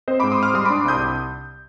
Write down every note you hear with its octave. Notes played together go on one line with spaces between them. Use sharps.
C4 C5 D#5
B5 D6
G#2
C6 D#6
G#2 D6 F6
G3 C6 D#6
B5 D6
D4
C2 D#6 G6